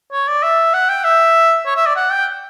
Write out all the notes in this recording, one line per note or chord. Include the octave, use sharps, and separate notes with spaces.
C#5
D5
E5
F#5
G5
E5
C#5
E5
D5
F#5
G5